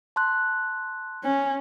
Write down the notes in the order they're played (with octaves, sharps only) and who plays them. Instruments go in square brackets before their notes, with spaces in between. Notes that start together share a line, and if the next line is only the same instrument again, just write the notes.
[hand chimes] A5 C6 F#6
[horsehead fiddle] C#4